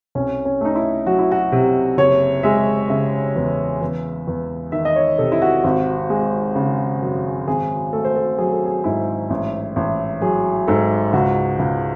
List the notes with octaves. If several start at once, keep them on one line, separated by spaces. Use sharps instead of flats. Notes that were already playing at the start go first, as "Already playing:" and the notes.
C2 C#4
C#4
A3 D#4
E4
F#3 F#4
E4
F#4
C3
F#1 C#5
G#3 E5
C#3 E5
E2
E2
E2
D#3 E5
D#5
C#5
C3 A4
E4
F#4
G#1
G#3
C#3
F#2
G#1 G#4
A3 A4
C5
A4
F#3 G#4
A4
G#4
G#2 E4
A1
A1
F#3 G#4
G#2 A4
C#2 F#4
C#2